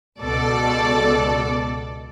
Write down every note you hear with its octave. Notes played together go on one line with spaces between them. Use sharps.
C#2 B2 A4 D5